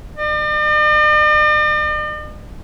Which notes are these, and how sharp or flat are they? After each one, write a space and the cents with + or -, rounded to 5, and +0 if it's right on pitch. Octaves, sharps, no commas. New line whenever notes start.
D5 +45